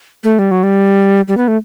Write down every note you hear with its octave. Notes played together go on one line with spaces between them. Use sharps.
A3
G3
F#3
G3
G3
B3
A3